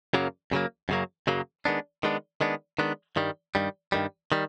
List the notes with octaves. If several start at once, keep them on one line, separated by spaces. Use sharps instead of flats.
F#2 C#3 F#3 A#3
F#2 C#3 F#3 A#3
F#2 C#3 F#3 A#3
F#2 C#3 F#3 A#3
D#3 G#3 B3 D4
D#3 G#3 B3 D4
D#3 G#3 B3 D4
D#3 G#3 B3 D4
G2 D#3 G3
G2 D#3 G3
G2 D#3 G3
D#3 G3